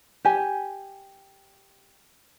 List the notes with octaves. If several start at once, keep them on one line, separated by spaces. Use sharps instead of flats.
G4 G#5